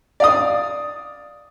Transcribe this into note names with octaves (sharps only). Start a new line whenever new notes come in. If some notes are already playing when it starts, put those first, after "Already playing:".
D5 F5 D#6